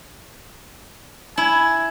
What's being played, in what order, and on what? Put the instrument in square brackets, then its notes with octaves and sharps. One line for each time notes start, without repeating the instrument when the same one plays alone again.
[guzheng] E4 [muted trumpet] G#5